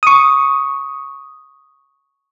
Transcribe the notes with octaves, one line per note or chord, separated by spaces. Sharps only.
C#6 D#6